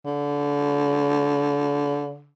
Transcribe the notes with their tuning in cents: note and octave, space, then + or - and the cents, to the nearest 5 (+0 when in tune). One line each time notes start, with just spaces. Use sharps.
D3 -30